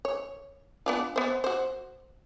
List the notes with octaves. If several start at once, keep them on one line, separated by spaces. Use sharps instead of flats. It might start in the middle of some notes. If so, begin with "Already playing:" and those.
C#5
B3 D4 F4
B3 C5
F#4 C5